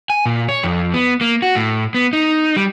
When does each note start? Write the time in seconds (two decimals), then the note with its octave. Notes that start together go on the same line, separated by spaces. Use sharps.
0.10 G#5
0.26 A#2
0.49 C#5
0.63 F2
0.94 B3
1.21 A#3
1.42 F#4
1.56 A2
1.95 B3
2.13 D#4
2.56 G3